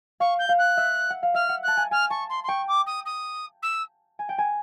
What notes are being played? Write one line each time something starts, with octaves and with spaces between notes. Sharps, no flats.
F5 C#6
G6
F5
F#6
E5
F#5
F5
E5 F6
F#5
A5 F#6
G#5
G#5 F6
A5 C#6
C6
C6
G5 C#6
D6
D#6
D#6
E6
G#5
G5
G#5